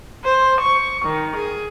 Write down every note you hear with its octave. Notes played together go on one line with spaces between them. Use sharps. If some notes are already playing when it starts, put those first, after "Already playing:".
C5
C#6
D#3
G#4